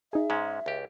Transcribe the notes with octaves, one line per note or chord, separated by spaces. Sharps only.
D#4 G#4 E5
G#2 G#3 C#4
C#2 G4